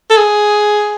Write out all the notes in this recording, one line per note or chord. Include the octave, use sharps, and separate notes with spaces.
A4
G#4